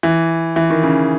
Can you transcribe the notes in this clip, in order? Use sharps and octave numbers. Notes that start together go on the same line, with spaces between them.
E3
E3
D#3
C#3